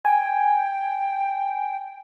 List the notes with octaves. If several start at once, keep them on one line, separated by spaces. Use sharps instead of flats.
G5 G#5